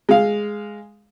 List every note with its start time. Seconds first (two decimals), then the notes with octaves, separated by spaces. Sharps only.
0.09 G#3 F5